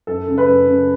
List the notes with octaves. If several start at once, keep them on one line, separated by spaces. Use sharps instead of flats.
F#2 A4
C#3
B4
F#2
C#3